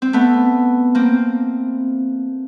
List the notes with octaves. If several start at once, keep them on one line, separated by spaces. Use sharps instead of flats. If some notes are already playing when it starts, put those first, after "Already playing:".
C4
A3 B3
A#3 C4